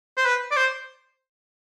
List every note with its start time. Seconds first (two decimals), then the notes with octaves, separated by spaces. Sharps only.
0.17 C5
0.26 B4
0.51 D5
0.56 C5